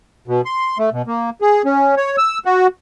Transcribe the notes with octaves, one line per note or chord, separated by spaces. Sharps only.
B2
C6
A3
B2
A#3
G#4
C#4
C#5
E6
F#4